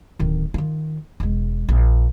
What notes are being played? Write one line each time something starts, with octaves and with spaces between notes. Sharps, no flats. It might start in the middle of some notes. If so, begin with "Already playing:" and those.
D1 D#3
D#3 F4
E1 G#3
A#1